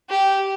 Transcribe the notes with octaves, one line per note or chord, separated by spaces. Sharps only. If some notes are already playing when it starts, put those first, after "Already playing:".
G4